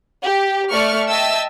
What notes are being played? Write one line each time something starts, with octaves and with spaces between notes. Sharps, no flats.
G4
A3 D5 C#6 F6
D#5 E5 G5 A5 E6